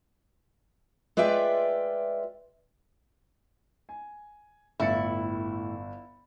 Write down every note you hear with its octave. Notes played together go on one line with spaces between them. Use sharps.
G#3 F4 B4 D5 E5 G5
G#5
G1 A2 E4 A6 C#7